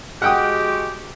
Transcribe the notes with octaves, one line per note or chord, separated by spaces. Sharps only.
G#3 F#4 G4 F#5 G5 D#6